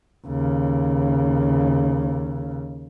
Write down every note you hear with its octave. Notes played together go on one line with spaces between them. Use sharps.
D#2 C#3